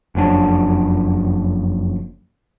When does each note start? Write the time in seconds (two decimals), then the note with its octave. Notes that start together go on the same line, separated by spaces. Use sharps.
0.15 F#1 F2 F#3 D4